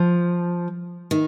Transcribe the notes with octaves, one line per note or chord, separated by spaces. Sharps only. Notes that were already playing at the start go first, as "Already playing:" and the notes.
Already playing: F3
D#3